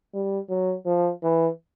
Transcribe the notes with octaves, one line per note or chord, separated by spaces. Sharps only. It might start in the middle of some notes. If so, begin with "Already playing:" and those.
G3
F#3
F3
E3